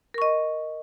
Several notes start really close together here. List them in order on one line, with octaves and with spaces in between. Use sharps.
A#4 C#6 D#5